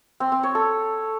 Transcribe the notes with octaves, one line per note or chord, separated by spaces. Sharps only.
C4
C4
C#5
A4